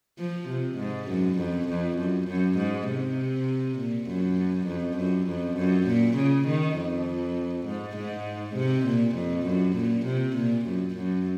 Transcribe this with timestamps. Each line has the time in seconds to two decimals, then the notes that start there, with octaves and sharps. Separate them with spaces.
0.19 F3
0.48 C3
0.78 G#2
1.08 F#2
1.38 F2
1.68 F2
1.98 F#2
2.28 F#2
2.58 G#2
2.88 C3
3.78 A#2
4.07 F#2
4.67 F2
4.97 F#2
5.27 F2
5.57 F#2
5.87 A#2
6.16 C#3
6.47 D#3
6.77 F2
7.66 G#2
7.96 G#2
8.56 C3
8.86 A#2
9.15 F2
9.46 F#2
9.76 A#2
10.05 C3
10.36 A#2
10.66 F#2
10.95 F#2